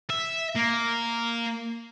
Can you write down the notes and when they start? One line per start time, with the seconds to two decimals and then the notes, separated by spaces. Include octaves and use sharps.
0.10 E5
0.55 A#3